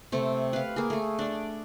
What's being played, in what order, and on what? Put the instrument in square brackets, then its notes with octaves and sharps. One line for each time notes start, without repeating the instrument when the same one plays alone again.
[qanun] C3 A3 G4
B4 F5
A#3 G#4
A3 G#4
D4 D5